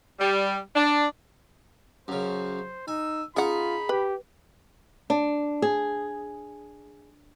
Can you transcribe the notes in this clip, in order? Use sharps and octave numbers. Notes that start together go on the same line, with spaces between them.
G3
D4
F#2 C#3 C5
D#4 G#5 E6
C#4 D#4 F4 G#4 F#5 B5
G4 B4
D4
G#4